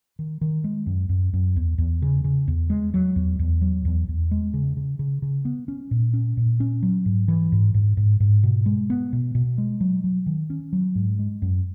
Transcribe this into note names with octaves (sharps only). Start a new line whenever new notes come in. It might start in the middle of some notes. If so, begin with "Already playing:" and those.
D#3
D#3
G#3
F#2
F#2
F#2
E2
E2
C#3
C#3
E2
G#3
F#3
E2
E2
F#3
E2
E2
G#3
C#3
C#3
C#3
C#3
B3
C#4
A#2
C#4
A#2
C#4
F#3
G#2
E3
G#2
G#2
G#2
G#2
B2
G#3
B3
B2
B2
G#3
F#3
F#3
D#3
C#4
F#3
G#2
G#3
F#2